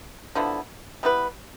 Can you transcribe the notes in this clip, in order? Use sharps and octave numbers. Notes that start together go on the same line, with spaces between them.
D3 F3 B3 E4
G3 B3 E4 B4